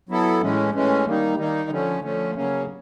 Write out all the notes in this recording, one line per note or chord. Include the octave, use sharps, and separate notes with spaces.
F#3 B3 E4 A4
A2 E3 G#3 C#4
A2 E3 G#3 C#4
D#3 G3 A#3 D#4
D#3 G3 A#3 D#4
D3 F3 A3 C#4
D3 F3 A3 C#4
C#3 F#3 A#3 C#4